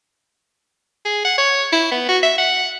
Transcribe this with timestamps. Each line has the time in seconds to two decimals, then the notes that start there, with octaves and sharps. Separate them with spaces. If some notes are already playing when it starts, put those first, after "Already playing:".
1.05 G#4
1.25 F#5
1.38 C#5
1.72 E4
1.92 B3
2.09 F#4
2.23 E5
2.38 F#5